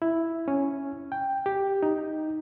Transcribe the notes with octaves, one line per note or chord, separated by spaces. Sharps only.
E4
C#4
G5
G4
D#4